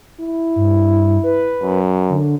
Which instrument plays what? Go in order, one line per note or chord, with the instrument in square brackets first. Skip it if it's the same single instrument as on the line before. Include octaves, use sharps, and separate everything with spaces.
[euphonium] E4
[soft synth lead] G2
B4
[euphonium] F#2
[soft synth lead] D3